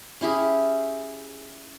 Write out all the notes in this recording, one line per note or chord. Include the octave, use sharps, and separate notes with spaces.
C#4 E4 G4 G#4